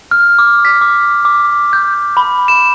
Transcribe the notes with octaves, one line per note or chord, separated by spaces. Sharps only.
F6
D6
B6
D6
D6
G6
B5
E7